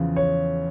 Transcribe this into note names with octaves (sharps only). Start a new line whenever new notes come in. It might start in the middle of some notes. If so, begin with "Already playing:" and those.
Already playing: E2 C#3 F3
C#5